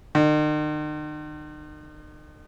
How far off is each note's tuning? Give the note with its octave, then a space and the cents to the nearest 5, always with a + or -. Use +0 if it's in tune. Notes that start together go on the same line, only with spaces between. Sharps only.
D#3 -40